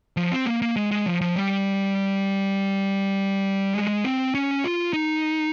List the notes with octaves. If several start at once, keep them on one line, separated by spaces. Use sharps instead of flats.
F3
C4
A#3
A#3
G#3
G#3
F3
F3
G3
G#3
C4
C#4
F4
D#4